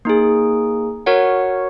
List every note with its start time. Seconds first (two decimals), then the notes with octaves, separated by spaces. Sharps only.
0.05 A#3 D#4 G#4
1.06 F#4 A#4 C#5 F#5